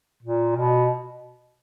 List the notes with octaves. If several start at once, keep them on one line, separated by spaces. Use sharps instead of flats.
A#2
B2